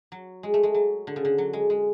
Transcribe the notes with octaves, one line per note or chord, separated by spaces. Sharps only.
F#3
G#3
A3
G#3
F#3
D3
C#3
D3
F#3
G#3
G#3